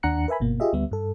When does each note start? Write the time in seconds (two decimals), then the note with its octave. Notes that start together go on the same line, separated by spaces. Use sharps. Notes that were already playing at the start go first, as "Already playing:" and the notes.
0.03 D#2 D4 F#5 A#5 F#6 C#7
0.28 A#4 B4 E5 G#5 B5
0.40 G1 B2 A#3
0.60 F4 G4 G#4 D#5 E5
0.73 D2 G3 B3 E5
0.91 G2 A4